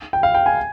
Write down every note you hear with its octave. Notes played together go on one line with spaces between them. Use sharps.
G5
F5
G5
G#5